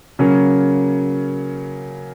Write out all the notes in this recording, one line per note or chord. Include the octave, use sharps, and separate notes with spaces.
C#3 F#3 A#3 C#4